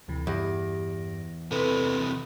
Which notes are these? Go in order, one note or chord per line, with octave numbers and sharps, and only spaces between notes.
D2 C3 E3
E2 G2 G4 A#6
C3 E3 A4 B4